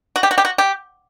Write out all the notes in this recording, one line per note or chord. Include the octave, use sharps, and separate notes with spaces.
F#4
G4
F#4
G4
F#4
G4